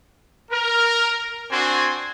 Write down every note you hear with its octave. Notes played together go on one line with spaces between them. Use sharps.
A#4
C4 D4 F#4 G#5 C6